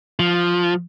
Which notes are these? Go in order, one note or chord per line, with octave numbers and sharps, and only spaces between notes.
F3